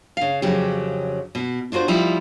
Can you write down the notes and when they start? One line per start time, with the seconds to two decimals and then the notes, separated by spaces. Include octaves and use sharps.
0.17 C#3 F5
0.42 F2 C#3 F#3 G4
1.35 B2
1.72 D4 F4 F#4 A#4 C5
1.88 F3 G3 D#4 E4